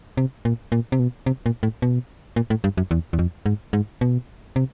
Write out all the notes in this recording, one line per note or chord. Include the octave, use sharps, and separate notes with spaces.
C3
A#2
A#2
C3
B2
C3
A#2
A2
B2
A#2
A2
G2
F#2
E2
E2
F2
G#2
G#2
B2
C3